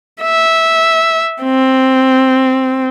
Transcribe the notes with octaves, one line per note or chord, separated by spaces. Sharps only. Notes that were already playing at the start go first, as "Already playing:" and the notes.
E5
C4